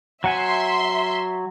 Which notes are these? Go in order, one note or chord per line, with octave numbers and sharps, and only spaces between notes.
F#3 E5 F#5 G#5 C6